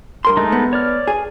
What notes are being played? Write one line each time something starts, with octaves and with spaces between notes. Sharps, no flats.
G2 A#4 C6
G#3 A3 D#4
B3
C#5 D5 F6
G#4